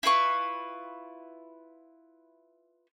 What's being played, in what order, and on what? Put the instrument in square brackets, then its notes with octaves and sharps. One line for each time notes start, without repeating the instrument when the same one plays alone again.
[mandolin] E4 F4 B4 C#6